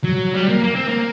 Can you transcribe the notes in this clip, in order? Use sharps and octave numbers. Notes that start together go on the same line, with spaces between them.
F#3
G3
A#3
A#3
C4
A#3